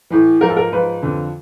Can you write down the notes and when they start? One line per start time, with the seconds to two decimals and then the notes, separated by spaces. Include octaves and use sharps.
0.10 A2 E3
0.41 G#2 F3 A#4
0.49 A4
0.57 A#4
0.72 G#2 F3 B4
1.02 F2 D3 F3